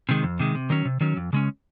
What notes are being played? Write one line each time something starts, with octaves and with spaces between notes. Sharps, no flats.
C3 D#3 G#3
F2
C3 D#3 G#3
C3
D#3 F#3 C#4
C3
D#3 F#3 C#4
F2
C#3 G#3 C#4